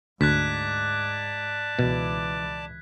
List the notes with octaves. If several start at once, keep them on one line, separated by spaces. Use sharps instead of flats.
D2 G#2 D5 A5 D6 F#6 G#6 B6
C#2 B2 E3